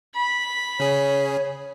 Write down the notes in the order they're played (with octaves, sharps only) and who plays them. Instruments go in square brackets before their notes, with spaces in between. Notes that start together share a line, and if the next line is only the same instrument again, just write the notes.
[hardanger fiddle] B5
[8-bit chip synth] C#3 G#4 [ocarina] C#5